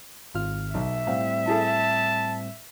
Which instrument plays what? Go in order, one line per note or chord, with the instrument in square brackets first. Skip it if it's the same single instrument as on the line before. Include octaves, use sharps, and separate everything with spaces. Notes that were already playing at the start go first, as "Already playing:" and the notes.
[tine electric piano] G#1 F6 [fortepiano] F4
[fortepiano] B1 [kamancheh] E5
[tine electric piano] A2 G3 C4 [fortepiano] F5
[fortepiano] E4 G#4 A4 [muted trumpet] A5